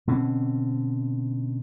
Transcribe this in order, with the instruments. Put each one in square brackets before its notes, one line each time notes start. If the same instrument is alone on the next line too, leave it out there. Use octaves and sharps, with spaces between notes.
[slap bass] B2 D3 C4 C#4